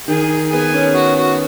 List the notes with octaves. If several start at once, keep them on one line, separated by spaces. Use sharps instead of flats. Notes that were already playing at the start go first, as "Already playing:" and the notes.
D#3 G#4
B3 G#4
C#4
F#4
F#4